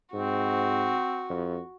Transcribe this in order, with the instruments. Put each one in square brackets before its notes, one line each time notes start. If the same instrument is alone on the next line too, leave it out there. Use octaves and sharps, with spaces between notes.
[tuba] G#2 [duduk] C4 [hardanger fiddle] F#4
[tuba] F2